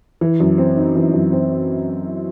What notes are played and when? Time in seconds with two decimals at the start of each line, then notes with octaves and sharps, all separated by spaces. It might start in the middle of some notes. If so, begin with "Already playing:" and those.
0.21 E3
0.40 F#2
0.58 C4
0.77 D#4
0.95 E3
1.13 F#2
1.32 C4